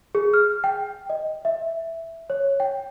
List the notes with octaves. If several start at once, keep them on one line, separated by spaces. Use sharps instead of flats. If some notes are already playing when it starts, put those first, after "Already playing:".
G#4
F6
G5
D#5
E5
C#5
G5